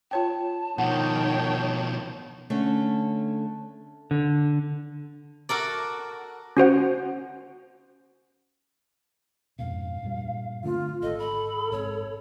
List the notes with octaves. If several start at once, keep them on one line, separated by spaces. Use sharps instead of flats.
F4 C#5 G5 A5
B2 D#3 F3 C#5 F#5 G5
D3 A3 C#4
D3
F#4 A4 A#4 D5
C#4 F#4 C5 F#5
F2 G#2 B2 F5
G2 A#2 G3
D3 A3 C4 F4
G#1 A4 D#5
B5
G#2 B2 C4 C#5